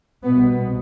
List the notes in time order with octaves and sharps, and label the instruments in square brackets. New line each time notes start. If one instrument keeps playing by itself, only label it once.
[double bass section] C2 B2 B3